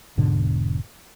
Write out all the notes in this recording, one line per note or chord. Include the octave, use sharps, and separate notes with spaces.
E1 G#2 B2 D3